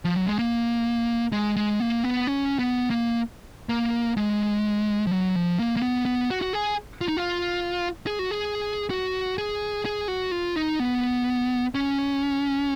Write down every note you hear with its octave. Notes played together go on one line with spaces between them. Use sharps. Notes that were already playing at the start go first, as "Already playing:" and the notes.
F3
F#3
G#3
A#3
G#3
G#3
A#3
B3
C#4
B3
A#3
A#3
G#3
F3
F#3
F3
A#3
A#3
B3
B3
F#4
F#4
G#4
F4
D#4
F4
G#4
F#4
G#4
F#4
G#4
G#4
F#4
F4
D#4
B3
C#4